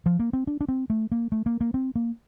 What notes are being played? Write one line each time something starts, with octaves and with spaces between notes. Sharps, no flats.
F3
A#3
C4
D4
D4
C4
A3
A#3
A3
A#3
A#3
C4
A#3